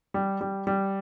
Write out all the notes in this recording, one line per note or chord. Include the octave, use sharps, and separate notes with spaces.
G3
G3
G3